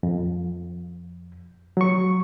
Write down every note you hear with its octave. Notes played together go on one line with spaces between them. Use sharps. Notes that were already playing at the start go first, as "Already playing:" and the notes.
F2
F#3 C#6